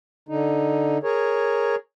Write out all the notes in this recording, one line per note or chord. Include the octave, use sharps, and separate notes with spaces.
D3 D#4
G#4 A#4 C#5